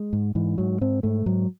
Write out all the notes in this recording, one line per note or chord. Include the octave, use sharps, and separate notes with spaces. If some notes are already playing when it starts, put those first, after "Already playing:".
Already playing: G#3
G#2
G#2 E3
G#2 F#3
G#2 C4
G#2 A3
G#2 F#3